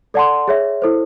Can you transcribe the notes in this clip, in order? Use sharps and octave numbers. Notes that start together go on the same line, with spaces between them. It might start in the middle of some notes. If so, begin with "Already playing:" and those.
A4 D5 F#5 A5 C6
G#4 C#5 E5
E4 A4 C5